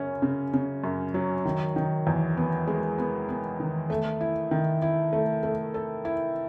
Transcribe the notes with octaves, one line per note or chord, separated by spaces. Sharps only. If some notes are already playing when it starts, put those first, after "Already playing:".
Already playing: F#2 C#3 C#4
C#3
C#3
F#2
F#3
D#3
D#3
E2
B3
G#3
B3
B3
D#3
A3
E4
D#3
E4
A3
A3
A4
E4